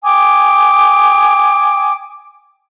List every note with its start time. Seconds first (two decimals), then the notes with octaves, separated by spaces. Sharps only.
0.04 G5 G#5 D6 D#6